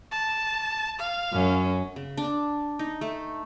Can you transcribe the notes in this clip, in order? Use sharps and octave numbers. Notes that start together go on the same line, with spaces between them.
A5
F5
F#2 C#4
C#3
D4
D#4
A3